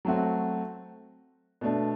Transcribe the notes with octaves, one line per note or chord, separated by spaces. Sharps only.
F#3 A3 C4 F#4
B2 A3 D4